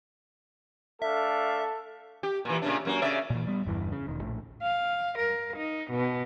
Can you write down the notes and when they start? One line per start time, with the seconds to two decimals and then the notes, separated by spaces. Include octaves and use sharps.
1.02 A3 D4 A4 E5 F5
2.23 G4
2.45 A#2 E3
2.62 A#2 C#3 D4
2.85 F#2 A#3 F#4
3.02 C#3 D5 E5
3.30 A#2 E3
3.47 G3 B3
3.66 G1 E2 G2 E3
3.92 C#3
4.07 E1 D#3
4.21 A#1 A2
4.62 F5
5.19 A#4
5.57 D#4
5.91 B2